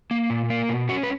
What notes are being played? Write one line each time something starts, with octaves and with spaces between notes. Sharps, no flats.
A#3
A#2
A#3
B2
C#4 F#4
B4